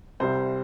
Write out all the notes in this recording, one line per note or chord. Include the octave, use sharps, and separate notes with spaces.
C2 C3 G3 C5